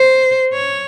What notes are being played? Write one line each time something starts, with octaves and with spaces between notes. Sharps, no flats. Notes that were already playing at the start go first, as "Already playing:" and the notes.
Already playing: C5
C#5